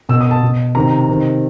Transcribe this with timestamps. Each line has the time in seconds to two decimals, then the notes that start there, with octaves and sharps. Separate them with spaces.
0.09 B2 E6
0.21 D#6
0.31 A5
0.42 B2
0.75 C3 D#3 A#5
1.09 C3 D#3